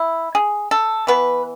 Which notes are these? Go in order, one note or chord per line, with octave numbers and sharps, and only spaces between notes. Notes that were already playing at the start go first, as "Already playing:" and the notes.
Already playing: E4
G#4
A4
E3 B3 B4